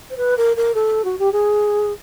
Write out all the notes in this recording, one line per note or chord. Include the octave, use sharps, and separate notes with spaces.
C5
B4
A#4
A#4
A4
F#4
G4
G#4